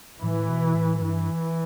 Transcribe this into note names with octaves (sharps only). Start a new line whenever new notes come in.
A2 E3
B2
A2
G2 E3